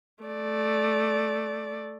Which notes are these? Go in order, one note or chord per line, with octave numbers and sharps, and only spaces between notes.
A3 D5